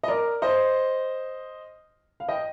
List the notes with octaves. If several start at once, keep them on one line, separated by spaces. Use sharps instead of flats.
D#5
A#4 D5
C5 D#5
F5
D#5 G5